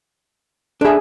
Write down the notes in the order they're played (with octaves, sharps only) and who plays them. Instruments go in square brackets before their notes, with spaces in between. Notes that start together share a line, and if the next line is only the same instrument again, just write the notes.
[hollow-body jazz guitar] D4 E5 [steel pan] G#4 A4